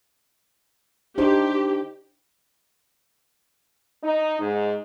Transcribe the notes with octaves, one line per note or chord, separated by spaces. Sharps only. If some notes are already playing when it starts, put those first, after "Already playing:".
D4 D#4 G4 C5
D#4
G#2